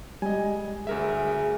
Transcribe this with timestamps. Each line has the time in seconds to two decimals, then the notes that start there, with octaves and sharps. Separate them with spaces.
0.22 G3 G#3 D#5 G#5
0.87 D2 G#4 A#4 E5